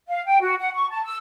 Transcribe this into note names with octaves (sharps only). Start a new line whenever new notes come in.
F5
G5
F#4
F#5
C#6
A5
E6